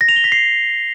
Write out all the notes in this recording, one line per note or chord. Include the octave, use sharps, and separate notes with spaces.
A#6
F7
G7
B6
C7